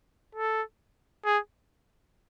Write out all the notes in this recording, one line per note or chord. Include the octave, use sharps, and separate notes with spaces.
A4
G#4